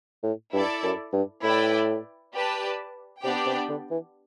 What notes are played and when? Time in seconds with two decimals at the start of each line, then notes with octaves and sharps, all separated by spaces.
0.23 A2
0.53 G2 E4 A4 D5
0.83 F#2
1.13 G2
1.43 A2 E4 B4 D5 G5
2.33 G4 B4 D5 A5
3.24 C3 B3 D4 G4 D5 G5
3.46 C3
3.69 D3
3.91 E3